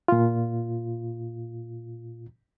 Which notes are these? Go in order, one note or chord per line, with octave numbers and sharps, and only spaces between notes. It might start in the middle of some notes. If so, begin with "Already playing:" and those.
A#2 F4